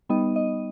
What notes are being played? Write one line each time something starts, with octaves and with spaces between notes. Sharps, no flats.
G3 B3 D#4 D#5
D#5